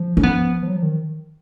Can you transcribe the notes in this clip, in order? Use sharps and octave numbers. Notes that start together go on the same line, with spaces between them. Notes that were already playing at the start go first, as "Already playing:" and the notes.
Already playing: F3
C#4
B3
F3
F#3
F3
D#3